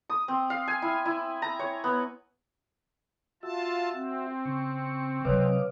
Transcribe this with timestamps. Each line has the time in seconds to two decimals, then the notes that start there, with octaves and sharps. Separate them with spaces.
0.10 D#6
0.28 C4
0.50 F5
0.68 G#5
0.82 E4
1.05 E4
1.42 A#5
1.59 C#5
1.84 B3
3.43 F4 F#4 E5 A5
3.94 C4
4.45 C#3 C#6
5.25 C3 F#3 B4 C#5 D#5 F5 D6